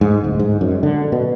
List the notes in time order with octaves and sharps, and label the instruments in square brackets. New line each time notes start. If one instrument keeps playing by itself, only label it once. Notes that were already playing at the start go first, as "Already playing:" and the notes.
[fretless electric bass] G#2
D1
G#2
F#2
D3
B2